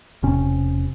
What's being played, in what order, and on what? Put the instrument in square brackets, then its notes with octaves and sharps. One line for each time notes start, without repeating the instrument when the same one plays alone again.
[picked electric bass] E1 C3 C#4